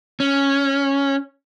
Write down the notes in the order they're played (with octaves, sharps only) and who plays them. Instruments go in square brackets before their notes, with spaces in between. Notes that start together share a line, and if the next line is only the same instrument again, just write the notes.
[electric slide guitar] C#4